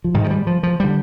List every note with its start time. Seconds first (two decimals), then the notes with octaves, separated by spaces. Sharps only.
0.04 F3
0.14 G#2 D#3
0.24 F3
0.30 G3
0.47 F3
0.63 F3
0.80 D3 G3